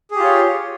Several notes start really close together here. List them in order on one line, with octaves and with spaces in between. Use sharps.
G#4 G4 F4 C#5